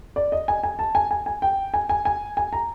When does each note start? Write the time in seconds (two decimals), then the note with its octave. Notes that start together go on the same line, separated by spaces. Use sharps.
0.16 D5
0.32 D#5
0.48 G#5
0.63 G#5
0.79 A5
0.95 G#5
1.11 G#5
1.26 G#5
1.42 G5
1.74 G#5
1.89 G#5
2.05 G#5
2.37 G#5
2.53 A#5